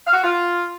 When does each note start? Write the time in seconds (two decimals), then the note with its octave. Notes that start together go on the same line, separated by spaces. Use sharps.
0.05 F5
0.13 F#4
0.21 F4